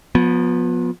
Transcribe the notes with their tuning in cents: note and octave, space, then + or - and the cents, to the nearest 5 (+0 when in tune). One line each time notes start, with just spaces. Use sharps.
F3 +35 B3 -10